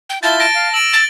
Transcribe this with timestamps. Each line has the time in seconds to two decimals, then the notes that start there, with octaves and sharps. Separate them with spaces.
0.10 G5
0.23 E4 F4 A5 G6 A6 G7
0.40 A5 A#6 D7
0.55 F5
0.74 E6 D7 F#7
0.93 A6